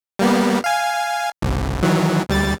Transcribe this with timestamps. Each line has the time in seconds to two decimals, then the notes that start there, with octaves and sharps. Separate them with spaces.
0.19 G3 A#3 B3
0.64 F5 G#5
1.42 G1 C2
1.83 D#3 E3 F#3
2.29 D2 G3 A6